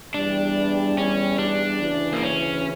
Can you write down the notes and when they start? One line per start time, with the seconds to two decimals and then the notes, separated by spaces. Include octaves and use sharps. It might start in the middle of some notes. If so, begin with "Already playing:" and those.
0.14 E2 E3 G3 D4
0.98 C#4
1.39 D4
1.82 D2 C#3 E3
2.13 A#3
2.23 C#4